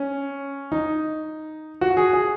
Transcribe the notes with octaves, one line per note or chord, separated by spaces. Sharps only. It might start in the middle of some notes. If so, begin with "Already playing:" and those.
Already playing: C#4
D#4
F#4
G#4
G#4